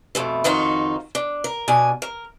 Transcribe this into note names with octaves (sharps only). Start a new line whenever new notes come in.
F2 B2 A3
F2 D#3 D#4 F4 F#4
D4
A#4
B2 D4 G#5
A#4